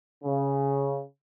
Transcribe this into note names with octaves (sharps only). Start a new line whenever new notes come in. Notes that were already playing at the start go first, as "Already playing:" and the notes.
C#3